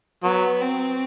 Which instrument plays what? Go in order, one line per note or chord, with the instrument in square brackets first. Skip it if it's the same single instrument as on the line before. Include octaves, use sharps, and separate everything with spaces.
[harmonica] F#3 [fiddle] B3
[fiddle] C4